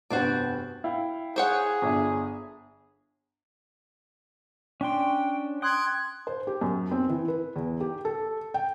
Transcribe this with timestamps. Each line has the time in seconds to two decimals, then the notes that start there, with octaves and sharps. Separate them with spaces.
0.10 F1 G2 B3 F#4 C5 D5
0.84 E4 F5 G5
1.36 G#4 C5 C#5 F#5
1.82 G1 D4 E5
4.81 C#4 D4 G5 C6
5.62 G5 C6 D#6 F#6 G#6
6.27 C5
6.47 G4
6.61 F#2
6.91 C4
7.09 E3
7.28 B4
7.56 E2
7.81 G4
8.05 A4
8.54 G5